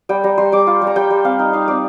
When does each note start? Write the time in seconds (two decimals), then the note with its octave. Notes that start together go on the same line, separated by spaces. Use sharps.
0.09 G3 G5
0.24 G3 A#5
0.38 G3 C6
0.52 G3 D6
0.67 F4
0.82 G3
0.87 A#5
0.96 G3 G5
1.10 G3
1.25 C4 F5
1.39 D#4
1.53 D#4 F5
1.68 C4 D5